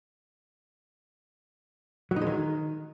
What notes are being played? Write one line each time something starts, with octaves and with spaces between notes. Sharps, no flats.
F#3
D#4
G#3
D#3